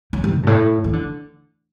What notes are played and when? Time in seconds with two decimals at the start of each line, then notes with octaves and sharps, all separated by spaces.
0.13 F#3
0.24 G3
0.35 B2
0.43 G2
0.47 A2
0.84 E3
0.93 D3